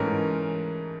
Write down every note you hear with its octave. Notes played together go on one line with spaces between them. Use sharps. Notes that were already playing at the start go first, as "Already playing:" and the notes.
Already playing: G#2 E3 A3 C#4 A#4